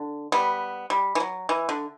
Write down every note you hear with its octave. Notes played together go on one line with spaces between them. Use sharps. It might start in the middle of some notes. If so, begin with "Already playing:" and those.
Already playing: D3
G3 B3
G3
E3
F#3
E3
D3